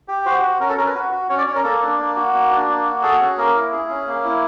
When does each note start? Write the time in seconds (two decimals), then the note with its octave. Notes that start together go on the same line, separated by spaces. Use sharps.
0.08 G4
0.25 F#4 C5
0.43 F#4
0.60 C#4 A#4
0.69 A4
0.77 C#4 A#4
0.86 B4
0.95 F#4
1.12 F#4
1.29 C#4 C#5
1.38 D5
1.47 C#4 C#5
1.55 A#4
1.64 A#3 A4
1.81 D4
1.99 A#3
2.16 F#4
2.33 A#3
2.51 D4
2.68 A#3
2.85 F#4
3.03 G#4 A4
3.20 C#4
3.38 A#3 A#4
3.55 E4
3.72 G#4
3.89 C#4
4.07 A#3
4.24 E4